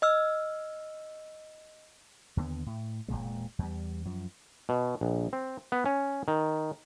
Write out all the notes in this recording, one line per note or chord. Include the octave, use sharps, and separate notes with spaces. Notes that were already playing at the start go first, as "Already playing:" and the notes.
D#5 E6 F6
D#2 D3 D#3 B3
A2
E1 D#2 A#2 G#3
E2 G3
F#2 F3
B2
A#1
C4
B3
C#4
D#3